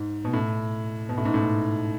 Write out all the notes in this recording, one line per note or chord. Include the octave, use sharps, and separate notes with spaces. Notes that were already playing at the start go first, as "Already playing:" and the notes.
Already playing: G#2
B2
A2
B2
A2
G#2
A2